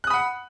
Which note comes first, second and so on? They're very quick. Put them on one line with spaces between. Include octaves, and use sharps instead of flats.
F#6 D#6 B5 F#5